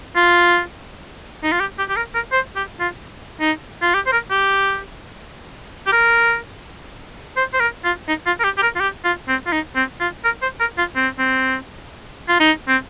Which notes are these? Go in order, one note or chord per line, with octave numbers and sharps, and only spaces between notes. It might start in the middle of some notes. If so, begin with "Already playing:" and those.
F4
D#4
F4
G4
G4
G4
A#4
A#4
C5
G4
F4
D#4
F4
G4
C5
A#4
G4
G4
A#4
C5
C5
A#4
F4
D#4
F4
A#4
G4
G4
A#4
F4
G4
F4
C4
F4
D#4
C4
F4
A#4
C5
A#4
F4
C4
C4
F4
D#4
C4